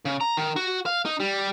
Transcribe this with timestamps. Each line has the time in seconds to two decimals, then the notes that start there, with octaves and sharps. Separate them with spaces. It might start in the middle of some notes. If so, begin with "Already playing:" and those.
0.05 C#3
0.21 A#5
0.37 D#3
0.56 F#4
0.86 F5
1.06 D#4
1.20 G3